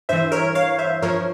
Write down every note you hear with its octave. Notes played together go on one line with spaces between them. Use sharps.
G2 E3 C5 E5
A#4 C#5
C#5 F5
C5 E5
G2 F3 A#4 C#5